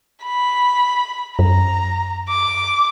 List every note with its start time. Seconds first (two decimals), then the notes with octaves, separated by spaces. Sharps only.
0.24 B5
1.39 F#2 A#5
2.29 D6